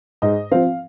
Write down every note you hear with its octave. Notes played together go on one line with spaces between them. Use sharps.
G#2 D#5
F3 C4 F5